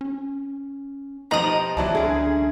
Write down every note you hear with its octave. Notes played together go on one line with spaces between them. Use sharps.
C#4
B2 F3 G3 D#4 C5 A#5 D#6 F#7
C#2 E3 F#3 E4 D5 A5
D3 C#4 G#4